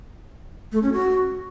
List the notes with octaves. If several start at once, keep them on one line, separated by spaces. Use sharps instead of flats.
A3
C#4
F#4